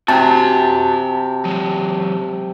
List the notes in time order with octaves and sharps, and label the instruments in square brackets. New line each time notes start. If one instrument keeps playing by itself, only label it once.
[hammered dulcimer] C3 [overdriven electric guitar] F#4 G#5 [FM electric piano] A5
[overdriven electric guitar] F#3 G#3